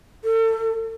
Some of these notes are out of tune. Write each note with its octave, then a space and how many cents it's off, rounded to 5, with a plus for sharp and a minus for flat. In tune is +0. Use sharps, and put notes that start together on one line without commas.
A4 +40